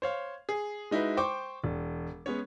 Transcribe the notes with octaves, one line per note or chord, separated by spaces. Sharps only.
C5 C#5 F5
G#4
G#3 D#4 E4 F#4 B4
C5 G5 C#6 D6
E1
G#3 B3 C#4 C#5